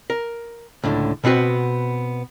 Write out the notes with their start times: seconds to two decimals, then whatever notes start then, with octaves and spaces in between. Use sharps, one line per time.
0.10 A#4
0.84 C#2 A2 D3
1.24 B2 B3 C4 F#4 B4